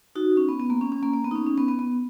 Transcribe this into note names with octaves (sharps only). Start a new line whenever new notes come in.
D#4 F#4
C#4
B3
B3
A#3
C#4
C#4
A#3
A#3
B3
D#4
C#4
C#4
B3
B3
B3